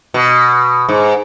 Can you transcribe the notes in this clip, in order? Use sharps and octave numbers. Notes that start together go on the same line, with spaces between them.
B2
G#2